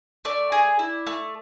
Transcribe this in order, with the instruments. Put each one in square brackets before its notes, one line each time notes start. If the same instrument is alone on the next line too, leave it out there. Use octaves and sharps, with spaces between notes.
[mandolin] A3 D5
G#4
E4
A3